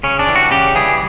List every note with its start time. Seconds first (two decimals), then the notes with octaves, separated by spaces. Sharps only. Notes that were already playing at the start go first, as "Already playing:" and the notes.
0.03 C#3 C#4
0.19 D4
0.28 E3 G3
0.36 F#4
0.51 C#3 G4
0.75 E3 G3 G#4